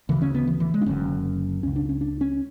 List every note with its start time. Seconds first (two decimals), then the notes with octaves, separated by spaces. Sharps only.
0.09 D2 C#3 E3
0.22 C#4
0.35 B3
0.47 E3
0.60 E3
0.74 G#3
0.81 D4
0.86 F#1 F#2 D3 C#4
1.63 C#2 C#3 C#4
1.76 D4
1.89 C#4
2.01 D4
2.21 C#4